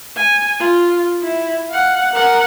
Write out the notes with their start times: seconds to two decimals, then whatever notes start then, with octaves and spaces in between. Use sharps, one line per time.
0.17 G#5
0.60 F4
1.23 E4
1.70 F5 F#5
2.13 A#4 F#5